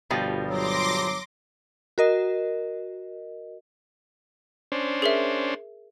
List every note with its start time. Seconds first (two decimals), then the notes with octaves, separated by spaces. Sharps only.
0.10 G1 B2 F3 G3
0.50 F#3 C6 D6 A#6
1.98 F#4 A#4 D#5
4.72 C#4 D4 C5
5.02 G#4 A#4 E5